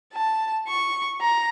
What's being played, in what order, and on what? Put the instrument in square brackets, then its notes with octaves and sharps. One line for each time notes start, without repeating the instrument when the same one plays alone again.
[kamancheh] A5
C#6
A#5